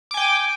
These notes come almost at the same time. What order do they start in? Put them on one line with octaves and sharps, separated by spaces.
D6 G#5 G5